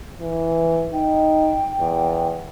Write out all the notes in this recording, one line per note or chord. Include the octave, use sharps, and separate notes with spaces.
E3
D#4 G5
E2